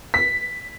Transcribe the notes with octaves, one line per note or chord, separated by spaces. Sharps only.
B6